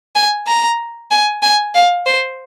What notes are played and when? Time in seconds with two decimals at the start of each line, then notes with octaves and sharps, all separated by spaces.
0.15 G#5
0.47 A#5
1.11 G#5
1.42 G#5
1.75 F5
2.06 C5